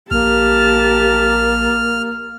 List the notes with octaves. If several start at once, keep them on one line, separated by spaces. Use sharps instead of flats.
A#1 A#3 G4 A5 F6